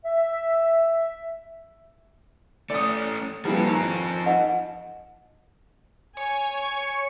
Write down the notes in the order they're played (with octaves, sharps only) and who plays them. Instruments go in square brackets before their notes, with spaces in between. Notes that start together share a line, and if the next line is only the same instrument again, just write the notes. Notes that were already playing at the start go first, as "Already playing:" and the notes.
[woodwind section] E5
[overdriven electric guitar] A3 C#4 [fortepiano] D5 D#6
[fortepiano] A#2 E3 G3 [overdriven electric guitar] F3 A4
[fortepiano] G#1 A#5
[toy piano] D#4 D#5 F#5
[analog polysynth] C#5 C#6 [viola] G#5